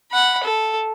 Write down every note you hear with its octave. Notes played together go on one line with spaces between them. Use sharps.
F#5 B5
A4